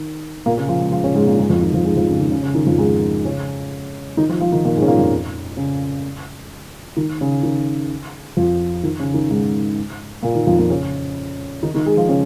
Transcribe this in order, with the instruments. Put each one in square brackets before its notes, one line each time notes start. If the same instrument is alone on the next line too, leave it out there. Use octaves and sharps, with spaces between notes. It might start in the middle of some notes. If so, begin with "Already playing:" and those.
Already playing: [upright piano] D#3
A#2 A#3
C#3 C#4
F3 F4
G#3 G#4
F3 F4
C#3 C#4
G#2 G#3
A#2 A#3
G#2 G#3
F2 F3
D#3
F2 F3
G#2 G#3
F2 F3
C#3
D#3
C#3
C#3
D#3
F2 F3
G#2 G#3
C#3 C#4
D#3 D#4
F3 F4
F3 F4
D#3 D#4
A#2 A#3
G#2 G#3
C#4
A#2 A#3
F2 F3
C#3
D#3
C#3
D#3
F2 F3
D#3
C#3
D#3
G#2 G#3
A#2 A#3
D#3
F2 F3
A#2 A#3
C#3 C#4
D#3 D#4
D#3 D#4
G#3 G#4
F3 F4
C#3 C#4